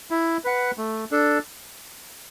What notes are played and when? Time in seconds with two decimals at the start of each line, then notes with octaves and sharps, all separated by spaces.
0.11 E4
0.44 B4 F#5
0.78 A3
1.11 D4 A4